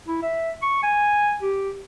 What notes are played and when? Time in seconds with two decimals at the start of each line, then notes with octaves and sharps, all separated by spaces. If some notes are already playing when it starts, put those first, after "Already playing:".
0.08 E4
0.22 E5
0.62 C#6
0.83 G#5
1.41 G4